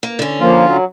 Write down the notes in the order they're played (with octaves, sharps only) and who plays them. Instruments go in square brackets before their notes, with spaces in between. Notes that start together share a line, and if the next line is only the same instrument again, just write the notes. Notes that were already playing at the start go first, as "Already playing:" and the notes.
[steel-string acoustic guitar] A#3
D3 C#4
[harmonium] F3 A#3 [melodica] F4
[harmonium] F#3